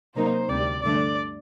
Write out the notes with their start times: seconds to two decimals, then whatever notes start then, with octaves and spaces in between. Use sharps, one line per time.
0.15 C3 F#3 A#3 D#4 C5
0.49 D2 C3 G3 D5
0.82 G2 D3 A3 D4 D5